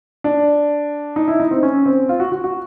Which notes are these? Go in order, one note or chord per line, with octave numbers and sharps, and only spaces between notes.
D4
D#4
E4
D#4
C4
C#4
C4
F4
F#4
F#4
F#4